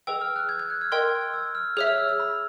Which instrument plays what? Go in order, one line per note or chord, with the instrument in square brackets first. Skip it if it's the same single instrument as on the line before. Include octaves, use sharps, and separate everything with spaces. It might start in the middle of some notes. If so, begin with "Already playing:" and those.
[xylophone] G#4 B4 D#5 G5 [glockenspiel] E6
[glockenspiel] F6
F#6
G#6
G#6
F#6
F6
[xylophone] A#4 D#5 G5 C6
[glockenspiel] E6
F6
[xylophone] G#4 C#5 E5 [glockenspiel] F6
[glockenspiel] F6
E6
E6
B5